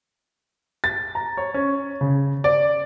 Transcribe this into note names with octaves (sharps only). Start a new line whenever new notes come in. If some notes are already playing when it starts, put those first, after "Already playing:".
A6
A#5
C#5
C#4
C#3
D5